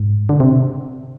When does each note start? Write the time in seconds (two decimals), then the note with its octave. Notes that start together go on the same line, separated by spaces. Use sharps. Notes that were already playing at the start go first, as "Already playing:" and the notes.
Already playing: G#2
0.29 D3
0.40 C3